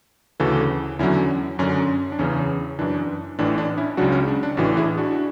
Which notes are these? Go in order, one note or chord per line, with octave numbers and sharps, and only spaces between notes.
D2 C#3 E3 F#4 A4
E2 D3 F#3 C#4 E4
F#2 D3 F#3 C#4
D4
E2 C#3 E3 C#4
F#2 E3 D4
A1 A2 E3 D4
D4
C#4 E4
C#2 C#3 F#3 D4 F#4
C#4
D4
D4
A1 A2 E3 D4 F#4
E4 G#4
D4 F#4